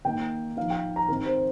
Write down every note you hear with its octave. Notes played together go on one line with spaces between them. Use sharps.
D#3 A#3 D#4 G5
F3 D#4 F5
G5
A#5
D#3 C4 D#4 A#4
C5